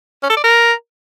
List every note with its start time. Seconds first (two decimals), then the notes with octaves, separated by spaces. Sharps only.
0.23 C#4
0.30 A4
0.37 D5
0.44 A#4